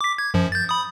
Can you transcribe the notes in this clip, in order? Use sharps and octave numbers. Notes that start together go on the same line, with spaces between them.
D6 B6
G#6
F#2 F3
G6 A6
B5 D#6